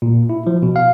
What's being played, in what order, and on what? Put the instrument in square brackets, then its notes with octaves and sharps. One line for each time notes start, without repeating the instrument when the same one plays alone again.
[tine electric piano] A#2
E4
F3
B2
F5